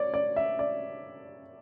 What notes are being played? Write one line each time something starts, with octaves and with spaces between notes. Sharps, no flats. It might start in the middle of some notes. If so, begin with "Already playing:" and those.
Already playing: C#5 D5
D5
E5
D5